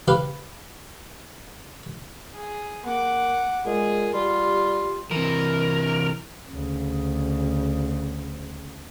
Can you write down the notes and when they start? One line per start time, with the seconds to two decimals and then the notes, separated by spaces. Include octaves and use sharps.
0.08 G4 B4 F5
2.34 G#4
2.85 A#3 F#5 D6
3.66 A#2 G#3 G#4
4.14 G3 F4 G4
5.11 C3 E3 A#4
6.49 D2 C#3